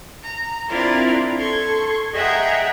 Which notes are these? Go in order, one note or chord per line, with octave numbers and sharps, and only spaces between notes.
A#5
C4 D4 E4 F4 A#4 D5
A4 C6 C#6 G#6
G#4 D#5 E5 F#5 G5 A#5